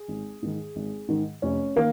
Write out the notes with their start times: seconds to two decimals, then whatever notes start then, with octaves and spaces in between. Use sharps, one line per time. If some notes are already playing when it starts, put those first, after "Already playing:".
Already playing: G#4
0.08 G#1
0.42 G#2 D#3
0.76 G#1
1.08 G#2 D#3
1.42 F1 C#4
1.76 D#3 A#3